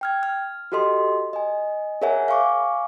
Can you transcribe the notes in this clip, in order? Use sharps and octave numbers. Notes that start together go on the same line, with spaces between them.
G5 F6 G#6
F6
F#4 G4 A4 D#5 C6
D#5 G#5
G#4 A#4 C#5 E5 F#5 G#5
F5 G#5 C#6 D6